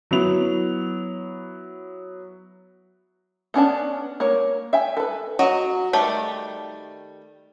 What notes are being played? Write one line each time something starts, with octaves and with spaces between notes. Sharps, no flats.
F#3 B3 E4 F7
B3 C#4 D4 A5
A#3 C#5
E5 G5 G#5
A4 B4
F#3 F#4 D#5
D#3 G3 A3 B5